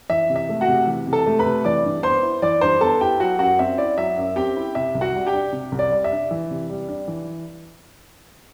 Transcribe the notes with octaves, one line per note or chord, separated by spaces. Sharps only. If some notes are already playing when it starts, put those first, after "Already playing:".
E3 E5
C3
E5
A3
F#4 F#5
C3
E3
C3
A4 A5
A3
B4 B5
C3
E3 D5 D6
G2
B3 C5 C6
E4
E3 D5 D6
G2 C5 C6
B3 A4 A5
E4 G4 G5
F#3 F#4 F#5
F#2 F#4 F#5
C4 E5
E4 D5
F#3 E5
F#2
C4 G4 G5
E4
C3 E5
C2
F#4 F#5
G3
G4 G5
D4
C3
C2
D5
G3
E5
D4
E3
C3
G3
D4
E3